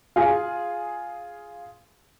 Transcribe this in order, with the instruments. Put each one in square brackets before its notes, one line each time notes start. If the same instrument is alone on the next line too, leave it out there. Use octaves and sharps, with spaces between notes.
[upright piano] F4 G#4